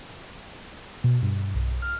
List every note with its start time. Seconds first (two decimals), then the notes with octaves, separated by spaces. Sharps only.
1.04 B2
1.22 G2
1.55 B1
1.82 F6